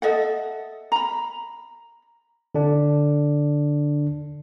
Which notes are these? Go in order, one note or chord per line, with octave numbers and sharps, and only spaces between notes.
A4 D#5 E5 F#5
A#5 B5
D3 D4